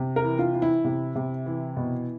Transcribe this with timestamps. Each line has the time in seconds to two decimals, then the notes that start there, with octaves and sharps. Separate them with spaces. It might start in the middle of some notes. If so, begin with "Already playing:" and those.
Already playing: C3
0.16 A#4
0.23 E3
0.39 F4
0.54 E3
0.62 E4
0.84 C3
1.15 C3
1.46 E3
1.77 B2